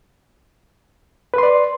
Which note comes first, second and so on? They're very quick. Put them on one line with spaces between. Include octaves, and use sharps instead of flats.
B4 C6 D5